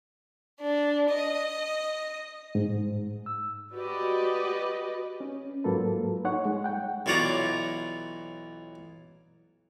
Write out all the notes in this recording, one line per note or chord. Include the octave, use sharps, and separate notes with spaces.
D4
D#5
G#2
E6
F#4 G4 B4 D5 D#5
C#4
G#2 F#3 A#3 F4 A4 B4
D#4 C#5 F#5 C#6
G#3
F#5 G5
B1 E3 F4 C#5 D5 A#5